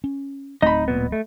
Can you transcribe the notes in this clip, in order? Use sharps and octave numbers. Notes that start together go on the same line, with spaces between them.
C#4
D1 A3 C4 D#4 D#5 B5
A#2 B3
A3